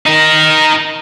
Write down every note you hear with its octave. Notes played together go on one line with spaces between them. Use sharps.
D#4 A#4